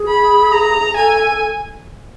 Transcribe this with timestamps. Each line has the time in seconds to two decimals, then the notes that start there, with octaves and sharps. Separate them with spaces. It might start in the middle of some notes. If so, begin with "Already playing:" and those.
Already playing: G#4
0.08 B5
0.52 A#5
0.96 A4 G#5